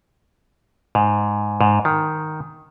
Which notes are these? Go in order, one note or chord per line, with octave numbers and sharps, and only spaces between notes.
G#2
G#2
D#3